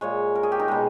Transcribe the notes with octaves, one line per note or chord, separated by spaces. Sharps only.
A#2 G#3 C#5
A#4
G#4
G4
D#4
B2 G#3